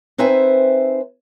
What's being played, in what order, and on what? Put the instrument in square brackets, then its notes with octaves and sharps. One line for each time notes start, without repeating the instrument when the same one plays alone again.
[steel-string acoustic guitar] C4 D#4 B4 C5 E5 G#5